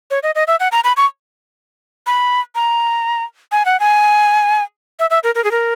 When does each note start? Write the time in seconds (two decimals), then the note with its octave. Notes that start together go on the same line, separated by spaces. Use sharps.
0.11 C#5
0.23 D#5
0.35 D#5
0.47 E5
0.60 F#5
0.72 A#5
0.84 B5
0.97 C#6
2.07 B5
2.55 A#5
3.52 G#5
3.65 F#5
3.80 G#5
4.99 E5
5.10 E5
5.23 A#4
5.35 A#4
5.44 G#4
5.51 A#4